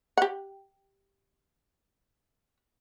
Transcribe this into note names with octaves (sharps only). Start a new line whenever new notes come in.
G4 F#5